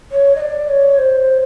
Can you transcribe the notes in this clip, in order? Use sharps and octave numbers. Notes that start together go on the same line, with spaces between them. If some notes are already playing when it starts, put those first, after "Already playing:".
C#5
D#5
D5
C#5
C5